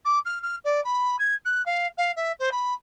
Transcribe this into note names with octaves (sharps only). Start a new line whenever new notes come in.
D6
F6
F6
D5
B5
G#6
F#6
F5
F5
E5
C5
B5